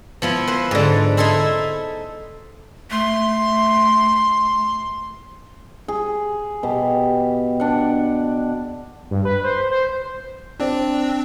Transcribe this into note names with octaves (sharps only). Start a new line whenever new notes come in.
F3 B3 E4
B4 C5
G#2 D3
D#4 E4 A4 C5 E5
A3 C6
G#4
B2 G4
D4 F#5
G2
B4
C5
C5
C4 D4 C5 D5